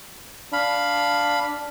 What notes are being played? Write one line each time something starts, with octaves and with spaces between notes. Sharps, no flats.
D4 F5 B5